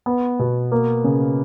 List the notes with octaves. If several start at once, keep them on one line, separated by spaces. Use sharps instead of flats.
B3
B2
A#3
C#3